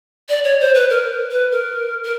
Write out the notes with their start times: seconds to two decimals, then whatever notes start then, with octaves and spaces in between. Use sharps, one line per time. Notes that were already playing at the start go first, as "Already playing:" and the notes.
0.29 D5
0.44 C#5
0.60 C5
0.75 B4
0.90 A#4
1.31 B4
1.52 A#4
2.04 A#4